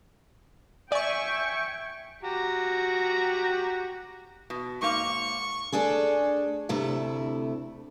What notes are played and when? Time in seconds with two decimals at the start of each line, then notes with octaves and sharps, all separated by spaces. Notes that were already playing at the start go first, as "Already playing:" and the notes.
0.92 D5 E5 G5 G#5 C#6
2.23 F#4 G4 A#5
4.50 B2
4.82 G#2 A#3 F5 C#6
5.72 A3 D4 G#4 A4
6.69 D2 C3 A3 E4